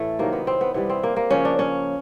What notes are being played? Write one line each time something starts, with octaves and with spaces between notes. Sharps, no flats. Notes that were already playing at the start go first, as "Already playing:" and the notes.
Already playing: A2 E3 A3
C3 D#3 F#3 A#3
B3
C4
B3
C3 E3 G3 B3
C4
A#3
A#3
C#3 F3 C#4
D4
C#4